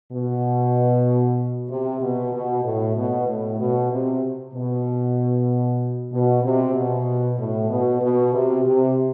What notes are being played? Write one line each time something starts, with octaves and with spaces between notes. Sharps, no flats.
B2
C3
B2
B2
A2
B2
A2
B2
C3
B2
B2
C3
B2
A2
B2
B2
C3
C3